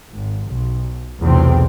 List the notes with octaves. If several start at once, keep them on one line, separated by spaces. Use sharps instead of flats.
G#1
B1
B1 E2 A2 C3 C4